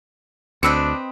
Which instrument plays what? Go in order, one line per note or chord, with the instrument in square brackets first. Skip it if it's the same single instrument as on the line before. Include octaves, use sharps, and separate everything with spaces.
[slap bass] D2 [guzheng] C4 B4 D#5 [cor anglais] D4 [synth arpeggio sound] E6 C#7